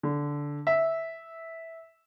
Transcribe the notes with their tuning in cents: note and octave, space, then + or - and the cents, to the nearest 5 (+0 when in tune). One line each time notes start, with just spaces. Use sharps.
D3 -15
E5 -10